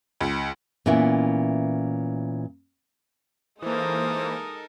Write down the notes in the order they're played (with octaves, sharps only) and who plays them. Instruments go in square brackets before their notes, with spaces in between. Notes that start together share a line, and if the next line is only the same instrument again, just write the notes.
[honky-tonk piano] C#2
[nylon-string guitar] A#2 E3 B3 C#4 E4 E5
[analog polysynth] E3 A#3 [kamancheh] G#3 D#6 [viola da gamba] D#4 A4 A#4 [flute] C5